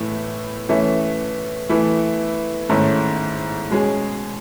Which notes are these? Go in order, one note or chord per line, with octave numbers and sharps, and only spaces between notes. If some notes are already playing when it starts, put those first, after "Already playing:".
Already playing: A2 E3 A3 E4
E3 A3 C#4
E3 A3 E4
G#2 D#3 A3 C#4 E4
B2 G#3 C#4 G#4